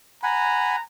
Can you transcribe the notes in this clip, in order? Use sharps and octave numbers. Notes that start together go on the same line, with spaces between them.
F#5 G#5 A#5 B5